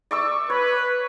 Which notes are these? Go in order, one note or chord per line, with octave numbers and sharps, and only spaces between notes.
D5 C#6 E6
B4 C#5